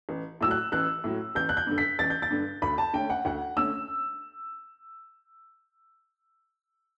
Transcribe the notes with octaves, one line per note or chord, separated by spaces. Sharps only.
A1
A2 F#3 E6
F#6
A1 F#6
A2 F#3
A1 G6
F#6
G6
G2 D3
B6
A1 A6
G6
A6
G2 D3
D2 B5
A5
D3 A3 C#4 G5
F#5
D2 F#5
D3 A3 C#4 E6